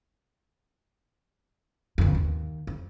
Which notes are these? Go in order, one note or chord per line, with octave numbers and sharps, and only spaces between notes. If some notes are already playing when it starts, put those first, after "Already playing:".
G1 F2
D#2
F2